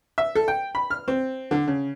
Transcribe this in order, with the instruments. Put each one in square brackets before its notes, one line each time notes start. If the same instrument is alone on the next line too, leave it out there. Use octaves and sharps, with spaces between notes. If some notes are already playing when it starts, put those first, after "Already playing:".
[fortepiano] E5
A4
G5
B5
F6
C4
D3
C#3